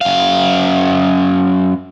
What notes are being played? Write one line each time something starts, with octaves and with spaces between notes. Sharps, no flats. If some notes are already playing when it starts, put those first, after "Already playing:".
F#2 F5